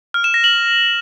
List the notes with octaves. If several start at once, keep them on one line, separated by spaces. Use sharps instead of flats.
F6
E7
A#6
F#7